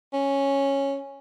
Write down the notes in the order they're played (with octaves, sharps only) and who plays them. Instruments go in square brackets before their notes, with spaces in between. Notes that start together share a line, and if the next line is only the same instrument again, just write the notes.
[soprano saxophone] C#4